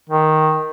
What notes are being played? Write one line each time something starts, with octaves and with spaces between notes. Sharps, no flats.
D#3